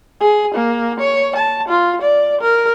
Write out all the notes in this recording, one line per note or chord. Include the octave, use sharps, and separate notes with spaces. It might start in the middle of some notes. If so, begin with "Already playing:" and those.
G#4
A#3
C#5
A5
F4
D5
A#4